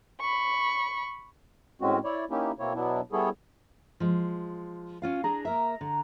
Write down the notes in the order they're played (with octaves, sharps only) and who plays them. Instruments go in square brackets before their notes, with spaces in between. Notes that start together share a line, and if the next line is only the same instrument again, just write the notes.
[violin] B5 C#6
[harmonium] A2 G#3 C4 C#4 F#4
E4 C#5 D5
A#3 C#4 D#4 E4 G4
B2 A#3 C4 E4 C#5
B2 F#3 B3 D4 E4
G3 B3 E4 G#4 A4 C#5
[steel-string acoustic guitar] F3 G#3
C#4 F4 F5
[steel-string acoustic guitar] D4 G#4 [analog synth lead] A#5
[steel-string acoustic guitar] A#3 A#4 E5
D3